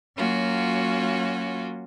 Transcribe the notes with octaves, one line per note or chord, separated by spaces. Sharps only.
F#3 A#3 C#4 F4 F#4